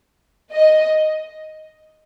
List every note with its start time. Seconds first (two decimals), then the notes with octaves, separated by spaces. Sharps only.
0.55 D#5